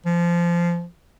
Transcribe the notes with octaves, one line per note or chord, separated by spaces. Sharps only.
F3